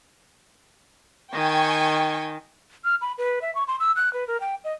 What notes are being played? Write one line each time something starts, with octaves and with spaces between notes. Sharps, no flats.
D#3 G5 G#5 C#6
F6
B5
B4
E5
C#6
C6
E6
F#6
B4
A#4
G5
D#5